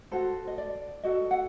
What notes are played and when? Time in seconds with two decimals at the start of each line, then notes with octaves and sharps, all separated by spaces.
0.12 F#4 A4 C5
0.48 D#5
0.58 D5
1.03 F#4 A4 D#5
1.31 F#5